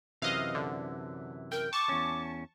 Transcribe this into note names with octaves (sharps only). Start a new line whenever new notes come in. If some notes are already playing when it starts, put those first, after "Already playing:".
F#2 C3 E3 D#5 F5
D3
A#4 G5
A5 C#6 D6
E2 C#4